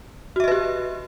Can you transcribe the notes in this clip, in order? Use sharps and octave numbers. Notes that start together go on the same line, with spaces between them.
F#4 G4 B4 D#5 E5